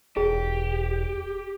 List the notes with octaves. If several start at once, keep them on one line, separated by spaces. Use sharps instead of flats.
E1 G4 G#4